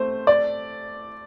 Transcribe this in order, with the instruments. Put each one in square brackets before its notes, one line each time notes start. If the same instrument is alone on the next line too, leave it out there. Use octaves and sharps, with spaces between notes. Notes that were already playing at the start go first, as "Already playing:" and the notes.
Already playing: [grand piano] A3 C4 [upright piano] C5
[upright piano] D5